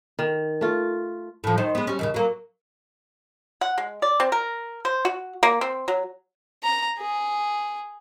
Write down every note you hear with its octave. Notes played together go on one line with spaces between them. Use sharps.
D#3
A3 F4
A2 F3
D#3 C5
G#3 B3
G3 C#4
D#2 A2 C#3
F#3 A#3
F#5
G#3
D5
C4
A#4
C5
F#4
A#3
C4
F#3
A#5
G#4